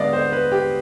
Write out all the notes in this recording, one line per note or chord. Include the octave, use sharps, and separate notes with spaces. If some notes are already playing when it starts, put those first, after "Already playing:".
Already playing: D3 G#3 B3 D5 D#5 F5
C5
B4
G4